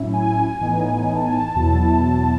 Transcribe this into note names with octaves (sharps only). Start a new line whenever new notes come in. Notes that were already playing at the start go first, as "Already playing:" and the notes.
Already playing: A2 F#3 C#4 E4
G#5
A2 E3 B3 D#4
A5
G#5
A5
E2 B2 F#3 B3 E4